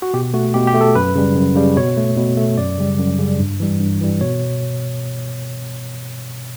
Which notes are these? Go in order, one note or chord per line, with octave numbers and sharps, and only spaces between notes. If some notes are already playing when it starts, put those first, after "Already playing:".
F#4
B2 G4
A3 F#4
B2 G4
G4
A3
A4
F#2 B4
C#3 G3
F#2
C#3 G3
B2 C#5
A3
B2
A3
F#2 D5
C#3 G3
F#2
C#3 G3
G2
E3 G3
G2
E3 G3
B2 C#5